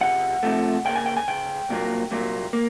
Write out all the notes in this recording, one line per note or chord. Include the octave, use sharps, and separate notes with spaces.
C#2 C3 F#5
C#2 C3 F3 A3
C#2 C#3 A#3 G5
G#5
G5
G#5
C#2 C#3 G5
C2 A#2 F#3 A#3
C2 A#2 F#3 A#3
A#3